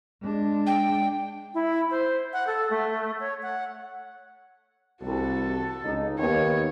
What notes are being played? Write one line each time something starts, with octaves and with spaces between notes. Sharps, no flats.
G#3 D4
G5
E4
C5
F#5
A4
A3
C#5
F#5
C2 F#4 A4
C#2 D#4
D#2 B3 C#5